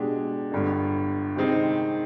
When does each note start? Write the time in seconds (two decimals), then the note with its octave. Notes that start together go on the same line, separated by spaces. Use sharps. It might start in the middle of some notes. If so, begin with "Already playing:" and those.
Already playing: B2 G#3 D4 G4
0.52 G1 G2 D3
1.36 C3 D#3 G#3 C4 D#4